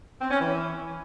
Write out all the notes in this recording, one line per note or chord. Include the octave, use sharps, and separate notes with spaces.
C4
C#4
E3